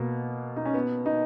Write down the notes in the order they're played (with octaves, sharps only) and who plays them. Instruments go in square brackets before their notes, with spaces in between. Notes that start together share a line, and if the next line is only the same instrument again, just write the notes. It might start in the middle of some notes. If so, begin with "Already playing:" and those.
Already playing: [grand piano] B2 A#3 [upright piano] B3
[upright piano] D#4
C#4
B3
D#4